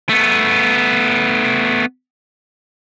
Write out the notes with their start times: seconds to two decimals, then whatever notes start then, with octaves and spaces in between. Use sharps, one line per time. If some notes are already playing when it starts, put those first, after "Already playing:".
0.09 A3 B3